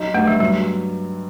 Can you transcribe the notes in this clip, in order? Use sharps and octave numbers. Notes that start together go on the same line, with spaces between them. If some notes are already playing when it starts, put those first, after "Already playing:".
Already playing: F#3 D#4
G2 A3
G3
F#3 G3